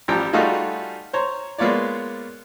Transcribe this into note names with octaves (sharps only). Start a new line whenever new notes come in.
A1 F3 G3 G4 G5 A#5
G3 A3 D#4 F4 F#4 G#4
C5 C#5 A#5
G#3 A#3 B3 F4 C#5 D5